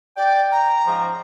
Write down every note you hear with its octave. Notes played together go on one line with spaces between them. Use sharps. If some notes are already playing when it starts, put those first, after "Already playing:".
D5 G5
A#5
G#2 C#3 F3